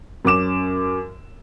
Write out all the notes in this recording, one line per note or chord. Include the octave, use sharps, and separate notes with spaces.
F#2 C#4 D6 E7